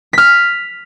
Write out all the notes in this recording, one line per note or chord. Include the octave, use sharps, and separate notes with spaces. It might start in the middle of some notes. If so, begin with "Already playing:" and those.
F6 B6